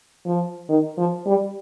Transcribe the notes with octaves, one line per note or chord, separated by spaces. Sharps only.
F3
D#3
F3
G3